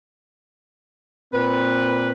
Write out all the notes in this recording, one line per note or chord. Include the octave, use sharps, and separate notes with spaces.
A#2 C4 B4